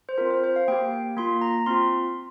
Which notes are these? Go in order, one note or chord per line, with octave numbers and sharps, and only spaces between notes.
C5
C4 F4 A#4
C5
C5
F5
A#3 G4 G5
A#3 F4 C6
A#5
C4 F4 C6